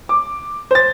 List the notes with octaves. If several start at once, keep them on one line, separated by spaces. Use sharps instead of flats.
D6
C5 A6